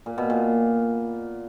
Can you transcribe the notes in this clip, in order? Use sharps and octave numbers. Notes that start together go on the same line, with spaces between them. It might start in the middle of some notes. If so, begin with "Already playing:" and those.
A#2
B2
A#2